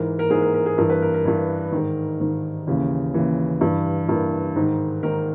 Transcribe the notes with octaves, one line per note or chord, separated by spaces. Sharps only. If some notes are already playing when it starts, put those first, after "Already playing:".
Already playing: G#2 E3 A#4
A#4
G#2 E3 G#4
A#4
A#4
G#4
G2 E3 A#4
B4
A#4
A#4
G2 E3
G#2 D#3
G#2 D#3
D#2 C#3 E3
D#2 C#3 E3
G2 E3
G2 E3 A#4
G#2 D#3
G#2 D#3 A#4